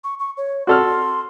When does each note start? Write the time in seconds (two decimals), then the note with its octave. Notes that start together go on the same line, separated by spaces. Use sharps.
0.04 C#6
0.20 C#6
0.37 C#5
0.67 F#4 A4 C6 F6